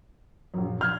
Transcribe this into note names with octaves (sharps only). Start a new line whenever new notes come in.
A#1 F#2
F6 G6 G#6